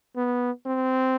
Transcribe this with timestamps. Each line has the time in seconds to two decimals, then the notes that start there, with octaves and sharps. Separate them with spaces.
0.16 B3
0.66 C4